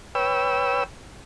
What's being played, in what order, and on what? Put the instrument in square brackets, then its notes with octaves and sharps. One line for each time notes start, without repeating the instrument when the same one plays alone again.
[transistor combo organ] B4 C#5 G5 E6